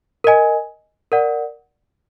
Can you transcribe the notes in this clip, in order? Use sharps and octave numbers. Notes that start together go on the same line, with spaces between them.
A#4 D#5 G#5
A#4 D5 F#5